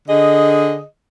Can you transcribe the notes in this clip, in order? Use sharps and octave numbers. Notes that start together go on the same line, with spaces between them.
D3 G#4 D#5